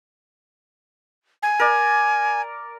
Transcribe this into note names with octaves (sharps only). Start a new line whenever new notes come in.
G#5
A#4 D5